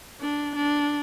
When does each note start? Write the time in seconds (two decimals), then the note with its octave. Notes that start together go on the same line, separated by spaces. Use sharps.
0.21 D4
0.56 D4